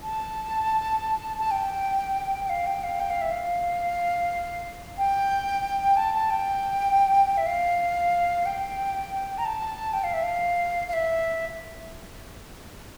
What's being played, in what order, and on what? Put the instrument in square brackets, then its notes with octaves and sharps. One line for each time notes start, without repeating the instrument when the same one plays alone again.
[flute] A5
A5
G5
G5
F5
G5
F5
G5
F5
E5
F5
G5
A5
A5
G5
E5
F5
G5
A#5
A5
G5
F5
E5
F5
F5
E5